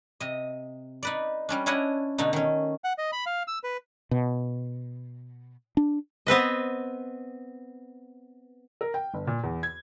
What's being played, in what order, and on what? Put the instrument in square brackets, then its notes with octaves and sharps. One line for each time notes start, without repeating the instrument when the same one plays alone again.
[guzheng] C3 D#5
D#4 B4 D5
G3 C#4 D4
C#4 D4 E4 C#5 D#5 F#5
B2 D3 A3 D#4
D#3 C#4
[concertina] F#5
D#5
B5
F5
E6
B4
[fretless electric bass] B2
D4
[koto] B3 C4 B4 D#5
[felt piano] A#4
G5
G1
A#2
E2
G#6